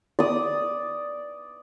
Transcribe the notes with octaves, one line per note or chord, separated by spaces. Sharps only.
D5 D#6